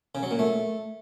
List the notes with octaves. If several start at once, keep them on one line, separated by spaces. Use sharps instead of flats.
C#3
F#3
A#2
A3